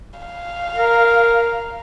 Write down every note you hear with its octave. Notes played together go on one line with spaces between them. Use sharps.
F5
A#4